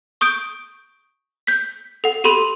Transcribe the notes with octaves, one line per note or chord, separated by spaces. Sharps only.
C#6 D#6 G6 D7
G6 B6
A4 F#5
G4 A4 B5 C6 D#7